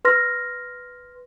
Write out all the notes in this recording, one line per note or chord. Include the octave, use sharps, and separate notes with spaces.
B4 C6 F6 A#6